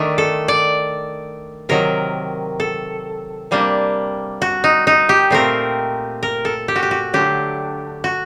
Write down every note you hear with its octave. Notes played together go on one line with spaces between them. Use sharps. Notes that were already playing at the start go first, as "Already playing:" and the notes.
Already playing: D#3 A3 D4
A4
D5
C3 D#3 F#3 A#4
A4
C3 G3 A#3 D4
F#4
D#4
D#4
G4
A#2 A3 C4 A#4
A#4
A4
G4
F#4
G4
F#4
D3 F#3 A3 D4 G4
F#4